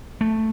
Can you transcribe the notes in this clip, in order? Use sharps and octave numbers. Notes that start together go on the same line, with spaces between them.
A3